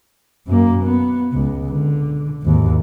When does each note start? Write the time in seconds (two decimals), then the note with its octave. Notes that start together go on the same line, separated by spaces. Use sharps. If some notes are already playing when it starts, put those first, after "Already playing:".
0.47 F#2 A#3
0.84 B3
1.33 C#2
1.71 D3
2.43 G#1 D#2